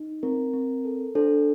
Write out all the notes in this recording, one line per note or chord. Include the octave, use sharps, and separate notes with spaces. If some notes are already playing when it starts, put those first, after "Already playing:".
Already playing: D#4
C4 A#4
C4
A4
D4 A4 C5